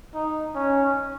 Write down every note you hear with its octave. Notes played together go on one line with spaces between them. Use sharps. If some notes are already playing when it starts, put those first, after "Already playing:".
D#4
C#4